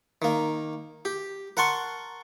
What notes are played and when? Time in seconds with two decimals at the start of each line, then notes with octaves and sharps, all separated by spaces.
0.22 D#3 A#3
1.05 G4
1.57 A#4 F#5 A5 C6 C#6